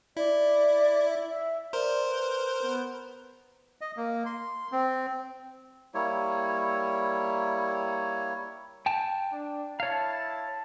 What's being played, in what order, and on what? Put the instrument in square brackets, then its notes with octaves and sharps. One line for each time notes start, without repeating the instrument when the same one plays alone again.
[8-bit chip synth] E4 [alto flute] D5
[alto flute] E5
E5
[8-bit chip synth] A#4 C5 [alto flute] D5
[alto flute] B4
B3
[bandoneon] D#5
A#3
C6
C4
[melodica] G3 A#3 E4 C#5
[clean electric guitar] G5 A5
[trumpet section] D4
[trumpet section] E4 A5 [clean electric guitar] C#5 F5